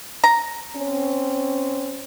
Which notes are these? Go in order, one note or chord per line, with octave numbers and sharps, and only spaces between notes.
A#5
C4 C#4